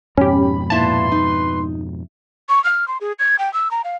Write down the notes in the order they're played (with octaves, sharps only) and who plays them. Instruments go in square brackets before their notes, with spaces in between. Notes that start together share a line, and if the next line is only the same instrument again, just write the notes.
[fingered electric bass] F2 G#2 B2 [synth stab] C#4 G4 [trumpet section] B5
[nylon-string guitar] A#2 E4 [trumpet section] B4 C6 [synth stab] A5
[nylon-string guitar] D#4
[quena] C#6
F6
C6
G#4
G#6
G5
E6
A#5
F5